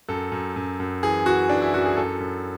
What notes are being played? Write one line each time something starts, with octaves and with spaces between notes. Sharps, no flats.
F#2 A4
F#2
F#2
F#2
E3 G#4
E3 F#4
E3 D4
E4
F#2 F#4
G#4
F#2 A4
F#2